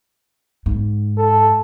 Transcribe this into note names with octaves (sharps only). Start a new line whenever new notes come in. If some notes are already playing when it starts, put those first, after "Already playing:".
G#2
A4